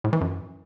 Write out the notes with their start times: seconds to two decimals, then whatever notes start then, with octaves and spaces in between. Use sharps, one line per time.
0.04 A2
0.13 E3
0.21 F#2